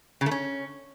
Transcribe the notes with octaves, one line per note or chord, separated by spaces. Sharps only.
C#3
A3
C#4